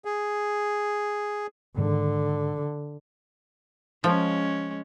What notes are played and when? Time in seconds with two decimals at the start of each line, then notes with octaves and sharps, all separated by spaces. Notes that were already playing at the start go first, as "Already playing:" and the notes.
0.05 G#4
1.78 G#2 D3 D#3
4.04 F3 G#3 C#4